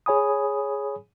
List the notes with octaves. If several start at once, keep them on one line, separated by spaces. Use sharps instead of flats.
G#4 C#5 G#5 B5 D#6